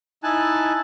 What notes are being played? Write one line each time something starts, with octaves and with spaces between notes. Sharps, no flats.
D#4 E4 G#5 A5 F#6